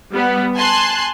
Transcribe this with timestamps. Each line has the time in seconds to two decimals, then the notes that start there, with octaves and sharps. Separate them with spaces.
0.11 G3 B3
0.56 G#5 A5 C6 F#6